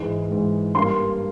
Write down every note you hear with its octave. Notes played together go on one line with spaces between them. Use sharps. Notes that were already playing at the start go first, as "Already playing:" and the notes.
Already playing: G#2 E3 G#3
G#2 E3 G#3
G2 G3 A#3 C6